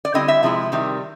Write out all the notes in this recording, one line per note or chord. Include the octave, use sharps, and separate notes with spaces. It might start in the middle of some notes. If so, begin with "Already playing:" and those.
D5
D3 G3 C4 E4 D#5
E5
C3 F3 G#3 B3 E4
C3 D#3 G3